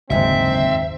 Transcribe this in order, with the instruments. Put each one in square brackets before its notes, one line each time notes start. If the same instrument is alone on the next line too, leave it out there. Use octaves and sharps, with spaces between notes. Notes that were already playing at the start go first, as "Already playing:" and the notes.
[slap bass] F#1 D#2 D3 [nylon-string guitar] G#2 F#4 [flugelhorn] C4 [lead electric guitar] E5